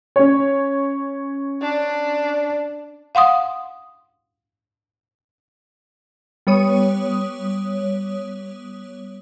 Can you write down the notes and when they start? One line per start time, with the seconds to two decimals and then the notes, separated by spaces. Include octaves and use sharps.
0.16 C#4 C#5
1.61 D4
3.15 F5 F#5 C6 D#6
6.47 G3 B3 C#5 D#6